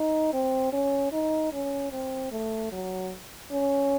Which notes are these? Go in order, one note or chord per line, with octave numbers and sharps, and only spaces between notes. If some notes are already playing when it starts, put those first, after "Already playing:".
Already playing: D#4
C4
C#4
D#4
C#4
C4
A3
F#3
C#4